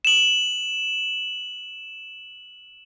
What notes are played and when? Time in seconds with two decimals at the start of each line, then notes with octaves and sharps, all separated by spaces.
0.05 E7 F#7